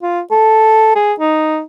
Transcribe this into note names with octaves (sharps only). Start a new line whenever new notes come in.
F4
A4
G#4
D#4